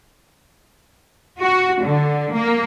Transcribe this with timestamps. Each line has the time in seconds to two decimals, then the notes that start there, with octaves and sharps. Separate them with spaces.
1.41 F#4
1.83 D3
2.33 A#3